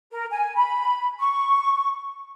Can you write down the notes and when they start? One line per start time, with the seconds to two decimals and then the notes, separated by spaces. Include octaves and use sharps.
0.11 A#4
0.32 G#5
0.55 B5
1.20 C#6